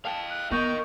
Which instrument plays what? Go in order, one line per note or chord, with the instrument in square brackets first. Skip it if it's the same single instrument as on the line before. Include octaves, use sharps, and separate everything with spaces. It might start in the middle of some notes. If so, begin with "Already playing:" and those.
[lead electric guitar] F5 G5 [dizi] A5
[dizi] F#6
[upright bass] B3 [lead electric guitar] A#4 D#5 [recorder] C#6 [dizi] G6